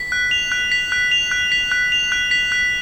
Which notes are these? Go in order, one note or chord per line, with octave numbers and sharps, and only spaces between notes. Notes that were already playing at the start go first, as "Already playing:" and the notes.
Already playing: B6
F#6
F7
F#6
B6
F#6
F7
F#6
B6
F#6
F7
F#6
B6
F#6